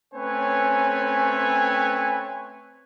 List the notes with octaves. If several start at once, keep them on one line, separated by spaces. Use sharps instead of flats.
A3 C4 C#4 B4 C#5 G#5